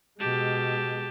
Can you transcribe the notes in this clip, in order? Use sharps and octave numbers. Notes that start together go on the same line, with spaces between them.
B2 G#3 G4 A5